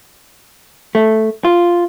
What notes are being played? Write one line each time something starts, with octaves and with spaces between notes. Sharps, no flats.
A3
F4